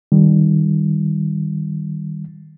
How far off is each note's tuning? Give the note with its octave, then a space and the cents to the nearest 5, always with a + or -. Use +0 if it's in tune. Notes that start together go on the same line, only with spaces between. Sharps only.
D#3 +0 G3 +0